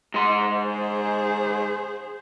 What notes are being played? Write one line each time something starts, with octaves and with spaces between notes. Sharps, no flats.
G#2 C6
G#4 C5